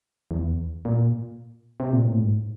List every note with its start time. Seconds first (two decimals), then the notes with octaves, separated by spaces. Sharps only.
0.31 E2
0.85 A#2
1.80 C3
1.93 A#2
2.06 A2
2.20 G#2